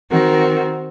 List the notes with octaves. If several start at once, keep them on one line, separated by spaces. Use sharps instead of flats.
D#3 C4 F#4 A#4